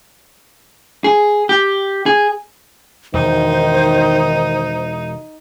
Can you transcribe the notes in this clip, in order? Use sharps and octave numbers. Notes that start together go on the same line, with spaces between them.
G#4
G4
G#4
E1 E2 D#3 D#4 C5